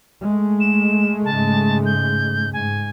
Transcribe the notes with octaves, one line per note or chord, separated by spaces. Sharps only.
G#3 A3
E7
G#2 C#3 A5
G6
G#2 G#5